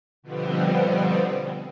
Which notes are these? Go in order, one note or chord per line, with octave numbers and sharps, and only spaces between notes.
B2 D3 F3 G3 B3 C4